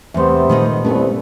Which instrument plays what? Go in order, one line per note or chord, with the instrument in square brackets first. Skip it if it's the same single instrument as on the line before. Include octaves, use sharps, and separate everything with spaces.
[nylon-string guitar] E2 A3 [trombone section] C3 B3 C5 [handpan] E5
[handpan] A#2 G#3 [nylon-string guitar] D#3 A3 D#5
[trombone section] C2 [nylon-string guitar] A3 B3 [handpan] C#4 B4